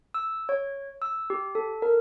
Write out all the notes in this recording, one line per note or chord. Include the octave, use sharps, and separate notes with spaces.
E6
C#5
E6
G4
A4
A#4